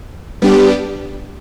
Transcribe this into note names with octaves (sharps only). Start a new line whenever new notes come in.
G3 B3 D4 G4